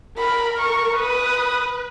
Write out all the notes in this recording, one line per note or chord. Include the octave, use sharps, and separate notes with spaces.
A#4 B5
C#6
B4 D#6